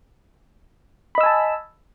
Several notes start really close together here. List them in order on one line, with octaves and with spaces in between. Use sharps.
B5 D#5 E6 G#5 A5